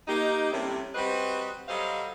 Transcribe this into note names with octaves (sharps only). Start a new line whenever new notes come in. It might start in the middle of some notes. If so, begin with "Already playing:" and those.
A#3 D#4 G4
A2 C3 G3 C#4 E4
G3 C4 F#4 B4 C5 D#5
F#3 G3 A4 C5 D#5 F5